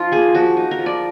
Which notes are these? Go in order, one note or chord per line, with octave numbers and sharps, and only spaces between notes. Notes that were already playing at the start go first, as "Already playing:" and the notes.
Already playing: F3 D#4 F4
A#3 G#4
F3 F#4
D#4
A#4
F3
D5